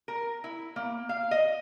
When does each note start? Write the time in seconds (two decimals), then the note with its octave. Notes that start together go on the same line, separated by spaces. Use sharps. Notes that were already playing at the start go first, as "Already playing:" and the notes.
0.08 A#4
0.44 E4
0.76 A#3
1.09 F5
1.31 D#5